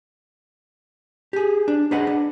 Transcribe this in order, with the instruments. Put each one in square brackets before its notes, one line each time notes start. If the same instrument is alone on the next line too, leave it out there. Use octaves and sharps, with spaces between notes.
[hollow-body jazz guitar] G4 G#4
D4
D4 G#4 B4 D#5 F#5
D4